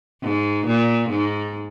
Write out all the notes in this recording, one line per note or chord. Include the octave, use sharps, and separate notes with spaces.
G#2
A#2
G#2